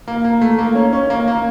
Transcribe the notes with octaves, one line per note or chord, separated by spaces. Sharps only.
A#3
A#3
A3
A#3
C#4
C#4
A#3
A#3